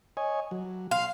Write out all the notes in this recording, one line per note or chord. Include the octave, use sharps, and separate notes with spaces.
C#5 D#5 G#5
F#3
F5 C6